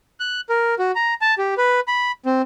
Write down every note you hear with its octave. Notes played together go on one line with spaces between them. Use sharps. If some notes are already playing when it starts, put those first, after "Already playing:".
F#6
A#4
F#4
A#5
A5
G4
B4
B5
C4